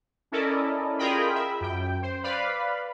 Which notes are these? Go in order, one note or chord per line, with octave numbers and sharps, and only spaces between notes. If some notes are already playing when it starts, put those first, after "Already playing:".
C#4 E4 A4 A#4 D5 D#5
F4 G#4 A#4 D#5 G5 B5
E5
F#2 G5
C5
B4 D5 F5 B5